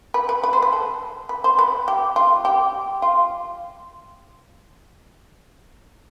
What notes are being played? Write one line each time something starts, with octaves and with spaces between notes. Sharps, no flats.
B4
B4
B4
C5
B4
A4
B4
C5
B4
G4
F4
G4
F4